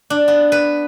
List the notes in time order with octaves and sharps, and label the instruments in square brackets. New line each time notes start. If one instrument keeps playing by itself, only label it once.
[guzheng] D4
B3
B4